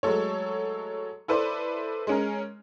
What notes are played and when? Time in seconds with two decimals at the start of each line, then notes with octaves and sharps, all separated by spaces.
0.03 F#3 G#3 A3 A4 C#5
1.28 E4 A4 B4 C5 D5 C6
2.07 G#3 C#4 A#4